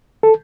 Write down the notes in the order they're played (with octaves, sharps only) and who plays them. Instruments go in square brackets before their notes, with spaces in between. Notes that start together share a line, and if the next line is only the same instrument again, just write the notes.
[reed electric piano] A4